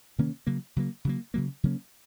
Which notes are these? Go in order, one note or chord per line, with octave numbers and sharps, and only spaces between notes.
C3 D#3 A#3 C#4
C#3 F#3 A#3
C#3 F#3 A#3
C#3 F#3 A#3
C#3 F#3 A#3
C#3 F#3 A#3 C#4